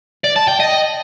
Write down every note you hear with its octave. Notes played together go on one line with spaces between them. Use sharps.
D5
A5
G5
D#5